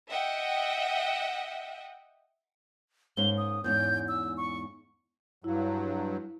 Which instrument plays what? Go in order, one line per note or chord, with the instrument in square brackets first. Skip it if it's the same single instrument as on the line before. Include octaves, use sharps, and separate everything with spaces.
[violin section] D#5 E5 F#5 G5
[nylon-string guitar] G#2 A#3 C#4 [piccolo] G7
[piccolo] D#6
[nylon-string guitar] E2 G#2 C#4 [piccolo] G6
[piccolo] E6
C#6
[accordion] G2 F#3 [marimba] E4 F5